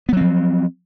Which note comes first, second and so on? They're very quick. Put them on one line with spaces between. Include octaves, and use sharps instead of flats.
B3 F#3 C4 F3